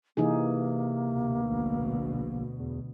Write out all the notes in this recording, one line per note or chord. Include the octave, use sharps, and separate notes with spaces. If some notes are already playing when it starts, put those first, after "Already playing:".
C3 E3 A#3 D#4 G#4
D2 B2
A#1
E2